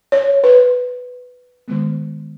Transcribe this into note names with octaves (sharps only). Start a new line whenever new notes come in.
C#5
B4
D#3 G#3 B3